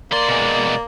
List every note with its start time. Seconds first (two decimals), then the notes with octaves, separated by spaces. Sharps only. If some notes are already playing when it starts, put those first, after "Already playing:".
0.12 D3 A#3 D5 C6
0.29 B2 G#3